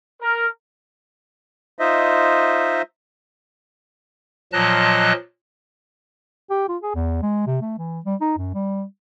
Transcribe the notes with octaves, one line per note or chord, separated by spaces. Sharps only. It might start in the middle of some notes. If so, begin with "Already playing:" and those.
A#4
D#4 F4 C5 D#5 E5
A#2 F3 F#3 D#5 A5 F#6
G4
F4
G#4
E2
G#3
C3
A3
E3
G3
D#4
F#2
G3